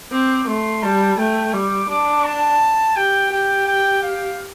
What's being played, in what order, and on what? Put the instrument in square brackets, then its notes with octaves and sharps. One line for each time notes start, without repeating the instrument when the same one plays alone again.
[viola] C4 [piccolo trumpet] D6
[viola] A3 [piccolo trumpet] C6
[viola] G3 [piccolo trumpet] A5
[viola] A3 [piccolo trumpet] G5
[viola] G3 [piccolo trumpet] D6
[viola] D4 [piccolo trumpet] D6
[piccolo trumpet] A5
[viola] G4 [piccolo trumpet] G5
[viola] G4 [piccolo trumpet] G5
[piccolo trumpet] G5
F5